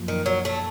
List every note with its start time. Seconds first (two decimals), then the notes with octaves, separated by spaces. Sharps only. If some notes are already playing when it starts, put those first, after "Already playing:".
Already playing: F#2 F3 A#3
0.08 D#3
0.26 F#3
0.45 A3